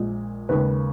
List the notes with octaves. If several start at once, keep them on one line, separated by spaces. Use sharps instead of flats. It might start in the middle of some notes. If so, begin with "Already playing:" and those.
Already playing: A#1 A#2 G#3
D#2 C#3 G#3 B4